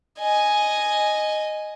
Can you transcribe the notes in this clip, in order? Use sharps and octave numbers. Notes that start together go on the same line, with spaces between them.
D#5 G#5